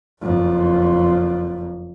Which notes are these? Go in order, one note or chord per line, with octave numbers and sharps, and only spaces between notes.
F#1 F2